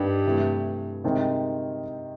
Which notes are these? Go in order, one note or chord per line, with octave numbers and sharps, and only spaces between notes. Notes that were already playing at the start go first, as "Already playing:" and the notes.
Already playing: G2 D#3 G3 B3 D4
C3 E3 A3
C3 D#3 G#3 C4 D#4